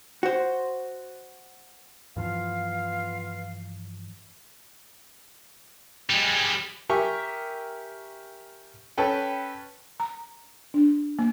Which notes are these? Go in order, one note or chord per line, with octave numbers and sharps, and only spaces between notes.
F#4 C5
G2 E3 F3 B3 F4 F5
G3 G#3
G4 A#4 E5 G#5 C#6
C#4 A4 B4 G5
A#5
D4
A#3